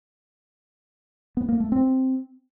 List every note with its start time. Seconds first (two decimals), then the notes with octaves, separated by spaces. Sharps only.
1.37 B3
1.49 A#3
1.60 A3
1.72 C4